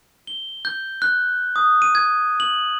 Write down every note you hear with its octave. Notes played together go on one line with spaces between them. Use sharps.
G7
G6
F#6
D#6
D#7
G#6
F#7